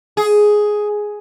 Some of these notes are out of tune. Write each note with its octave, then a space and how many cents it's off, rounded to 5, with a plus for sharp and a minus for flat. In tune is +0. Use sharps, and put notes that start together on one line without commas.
G#4 +5